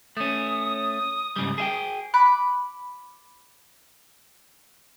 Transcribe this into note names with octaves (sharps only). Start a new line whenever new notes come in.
A3 C#4 D#6
G#2 C#3 G3
G#4 E5 G5
B5 D6 F#6